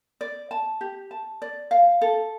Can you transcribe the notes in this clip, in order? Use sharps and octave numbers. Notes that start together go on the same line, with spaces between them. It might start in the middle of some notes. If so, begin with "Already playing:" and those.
D5
A5
G4
A5
D5
F5
A4